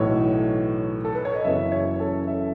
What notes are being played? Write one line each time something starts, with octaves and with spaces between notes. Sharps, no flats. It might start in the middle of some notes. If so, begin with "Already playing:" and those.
Already playing: B1 A2 E3 C#5
A4
B4
C#5
D#5
F#1 F#2 C#3 E3 E5
C#5
A4
E5